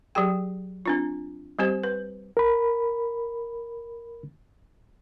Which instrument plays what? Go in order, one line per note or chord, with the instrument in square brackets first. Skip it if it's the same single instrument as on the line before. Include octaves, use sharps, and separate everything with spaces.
[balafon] F#3 G4 G#4 G5
C4 D4 F4
G3 C4 G4 C5
B4
[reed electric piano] A#4 B5